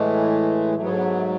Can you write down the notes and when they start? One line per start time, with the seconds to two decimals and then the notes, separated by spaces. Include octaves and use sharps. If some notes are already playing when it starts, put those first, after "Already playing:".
Already playing: A2 E3 G#3 A3
0.75 G#2 F#3 A3
0.82 B3
0.89 A3
0.96 B3
1.03 A3
1.10 B3
1.17 A3